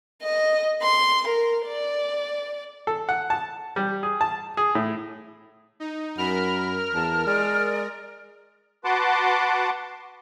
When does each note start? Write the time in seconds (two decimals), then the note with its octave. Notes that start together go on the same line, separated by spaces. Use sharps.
0.23 D#5
0.82 C6
1.28 A#4
1.67 D5
2.87 A4
3.09 F#5
3.30 A5
3.76 G3
4.03 G#4
4.21 A5
4.57 G#4
4.75 A2
5.80 D#4
6.18 F#2 A#4 B5 F6
6.94 E2 A5
7.26 G#3 D5
8.85 F#4 B4 F#5 A5 C6 D6